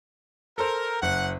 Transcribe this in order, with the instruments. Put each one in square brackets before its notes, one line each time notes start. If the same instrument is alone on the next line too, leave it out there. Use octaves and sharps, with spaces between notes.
[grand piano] A4 C5 [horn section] A#4
[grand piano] F#1 [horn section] F#5